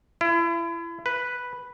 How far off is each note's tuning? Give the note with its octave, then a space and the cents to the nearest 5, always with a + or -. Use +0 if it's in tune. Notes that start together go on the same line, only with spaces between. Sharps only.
E4 +35
B4 +0